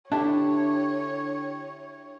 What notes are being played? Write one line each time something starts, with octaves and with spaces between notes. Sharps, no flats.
D3 D4 E4 G4 C#5 A5